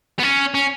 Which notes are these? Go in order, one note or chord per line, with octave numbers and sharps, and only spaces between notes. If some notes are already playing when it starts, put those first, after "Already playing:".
B3
C#4
C#4